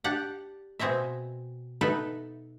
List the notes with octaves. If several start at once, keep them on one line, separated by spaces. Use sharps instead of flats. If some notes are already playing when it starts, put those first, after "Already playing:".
D4 G4 D5 F#5
B2 C4 G#4 D#5 E5
B3 D#4 A4 B4 E5